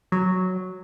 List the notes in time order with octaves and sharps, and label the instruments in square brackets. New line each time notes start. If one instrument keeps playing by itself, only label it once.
[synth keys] F#3